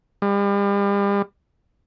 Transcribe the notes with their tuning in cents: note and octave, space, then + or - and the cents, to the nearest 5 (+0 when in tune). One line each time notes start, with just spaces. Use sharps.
G3 +40